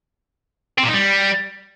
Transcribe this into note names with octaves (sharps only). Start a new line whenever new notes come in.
C4
A#2
D#4
G3